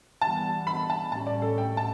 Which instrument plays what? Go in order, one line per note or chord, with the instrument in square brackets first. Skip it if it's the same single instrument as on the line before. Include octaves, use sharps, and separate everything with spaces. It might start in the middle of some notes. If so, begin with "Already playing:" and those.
[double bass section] E3 G3 B3 [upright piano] A5
[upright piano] B5
A5
[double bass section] A2 G3 C#4 [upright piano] A5
[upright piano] D5
A4
G5
A5